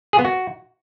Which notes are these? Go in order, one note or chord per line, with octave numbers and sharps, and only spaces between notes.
G#4
B3
F#4